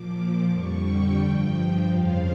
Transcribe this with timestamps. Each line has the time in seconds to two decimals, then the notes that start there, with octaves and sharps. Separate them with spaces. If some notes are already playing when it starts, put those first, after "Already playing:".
Already playing: A#2 F3 D6
0.48 F2 D3 G3 C#6
0.83 G5
1.17 G2 F3 G5
1.86 F2 C#3 F3 F5